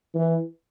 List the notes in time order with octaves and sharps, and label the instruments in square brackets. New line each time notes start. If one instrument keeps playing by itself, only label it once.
[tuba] E3